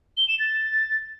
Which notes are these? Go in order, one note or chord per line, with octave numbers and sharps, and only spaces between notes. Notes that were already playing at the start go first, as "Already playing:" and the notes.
G7
E7
A6